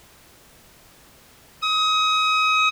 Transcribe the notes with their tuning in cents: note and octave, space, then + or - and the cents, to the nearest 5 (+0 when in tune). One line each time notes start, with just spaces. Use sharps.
D#6 +30